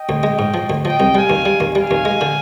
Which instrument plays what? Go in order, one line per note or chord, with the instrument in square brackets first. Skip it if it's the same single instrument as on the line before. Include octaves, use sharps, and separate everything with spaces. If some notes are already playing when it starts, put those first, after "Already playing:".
Already playing: [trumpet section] D#5 G5
[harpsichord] D2
G#3
G#2
F3
D2
[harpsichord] F3 [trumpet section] D#5 G5
[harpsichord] C2
[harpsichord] G3 [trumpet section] F5 G#5
[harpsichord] D#2
G3
D#2
[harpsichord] G3 [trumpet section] F5 G#5
[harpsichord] D#2
G#3
D3